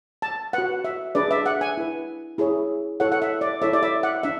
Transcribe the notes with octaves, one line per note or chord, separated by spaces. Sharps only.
A5
F#4 B4 F#5
E5
D4 G#4 B4 D5
E5
F#5
G#5
E4 B4
E4 G#4 C#5
E4 A4 C#5 F#5
F#5
E5
D5
E4 A4 C#5 E5
D5
E5
F#5
D4 E5